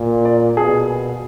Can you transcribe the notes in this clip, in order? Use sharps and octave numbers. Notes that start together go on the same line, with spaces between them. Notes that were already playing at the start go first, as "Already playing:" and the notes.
Already playing: A#2
D5
B2 G#4